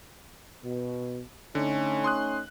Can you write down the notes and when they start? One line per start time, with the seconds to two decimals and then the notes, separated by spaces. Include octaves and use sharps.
0.64 B2
1.55 D3 A3 C#4 D#4
2.04 C6 D#6 F#6